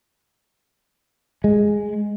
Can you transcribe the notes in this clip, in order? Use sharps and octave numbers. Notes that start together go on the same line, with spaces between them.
G#3